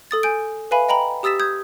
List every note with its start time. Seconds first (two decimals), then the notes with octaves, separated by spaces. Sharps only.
0.11 A4 D#6 A6
0.23 G#5 G6 D7
0.71 B4 E5 F5 G#5 B5
0.89 D#5 G5 A#5 B5 F#7
1.23 G4 D#6 E6 A6 B6 E7
1.40 D#6 G6 G#6